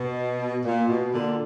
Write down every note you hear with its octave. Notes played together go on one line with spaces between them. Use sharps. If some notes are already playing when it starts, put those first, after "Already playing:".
Already playing: B2
A#2
B2
A#2 D3